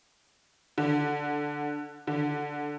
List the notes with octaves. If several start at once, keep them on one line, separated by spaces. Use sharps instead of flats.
D3
D3